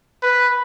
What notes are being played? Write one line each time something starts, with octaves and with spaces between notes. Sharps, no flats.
B4